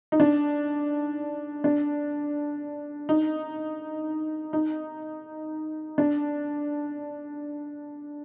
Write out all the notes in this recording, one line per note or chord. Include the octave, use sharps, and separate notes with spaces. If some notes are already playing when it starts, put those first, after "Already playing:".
D#4
D4
D4
D#4
D#4
D4